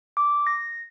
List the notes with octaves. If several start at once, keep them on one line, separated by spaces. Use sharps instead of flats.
D6
A#6